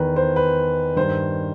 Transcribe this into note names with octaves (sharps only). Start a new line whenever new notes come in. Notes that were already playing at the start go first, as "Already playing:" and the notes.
Already playing: E2 D#3 B4
C5
B4
G2 D#3 C5